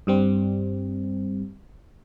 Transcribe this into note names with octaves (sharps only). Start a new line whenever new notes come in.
G2 G3 C4